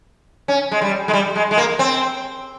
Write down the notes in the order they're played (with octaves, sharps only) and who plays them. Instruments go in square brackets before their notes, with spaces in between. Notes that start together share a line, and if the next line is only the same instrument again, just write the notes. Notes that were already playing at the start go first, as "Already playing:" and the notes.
[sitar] C#4
G#3
G3
G#3
G3
G#3
G#3
A#3
C4